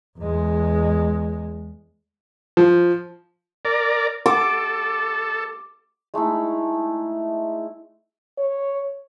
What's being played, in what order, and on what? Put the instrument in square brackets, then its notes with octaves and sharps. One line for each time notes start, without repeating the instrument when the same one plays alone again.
[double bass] E2 G#3
[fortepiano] F3
[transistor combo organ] A#4 D5
[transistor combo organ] A4 [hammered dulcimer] D6
[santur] G#3 A3 D#4 E4
[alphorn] C#5